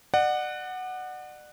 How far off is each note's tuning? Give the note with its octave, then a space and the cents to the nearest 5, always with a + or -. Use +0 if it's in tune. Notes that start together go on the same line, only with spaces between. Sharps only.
D5 +40 F#5 +0